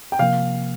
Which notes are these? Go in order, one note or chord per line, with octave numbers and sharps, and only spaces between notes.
G5
C3 F3 A#3 F5